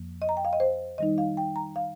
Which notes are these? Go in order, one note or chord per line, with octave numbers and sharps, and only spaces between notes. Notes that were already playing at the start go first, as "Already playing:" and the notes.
Already playing: F2 F3 A#3
D#5
A#5
G5
F5
D#5
C5
D#3 G3 D#4 D#5
F5
G5
A#5
F5